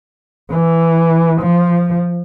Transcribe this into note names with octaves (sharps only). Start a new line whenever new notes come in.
E3
F3